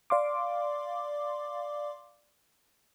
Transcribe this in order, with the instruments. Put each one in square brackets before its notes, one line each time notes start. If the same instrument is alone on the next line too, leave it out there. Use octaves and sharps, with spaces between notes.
[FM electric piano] D5 F5 C6 D6